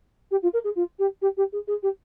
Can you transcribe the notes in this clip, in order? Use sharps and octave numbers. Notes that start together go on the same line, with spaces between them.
G4
F4
A#4
G#4
F4
G4
G4
G4
G#4
G#4
G4